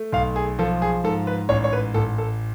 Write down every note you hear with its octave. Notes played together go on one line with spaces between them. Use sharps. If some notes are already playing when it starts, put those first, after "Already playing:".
Already playing: A3
B1 F5
G#4
F3 A4
G#4
G#2 A4
B4
A1 C#5
C#5
B4
A1 A4
A4